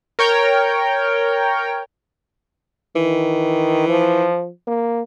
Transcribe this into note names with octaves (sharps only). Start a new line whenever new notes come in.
A#4 C#5 G5
D#3 E3
F3
A#3